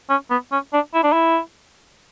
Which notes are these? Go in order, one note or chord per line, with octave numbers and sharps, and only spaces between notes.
C#4
B3
C#4
D4
E4
D4
E4